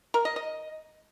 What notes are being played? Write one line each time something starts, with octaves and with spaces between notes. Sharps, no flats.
A#4
D#5
D#5